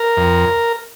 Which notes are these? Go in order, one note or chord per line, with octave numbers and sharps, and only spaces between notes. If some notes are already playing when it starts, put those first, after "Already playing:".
Already playing: A#4
F2